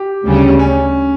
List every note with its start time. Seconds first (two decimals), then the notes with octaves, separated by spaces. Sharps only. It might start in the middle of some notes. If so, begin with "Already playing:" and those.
Already playing: G4
0.25 D2 C#3 G3 C#4
0.59 C#4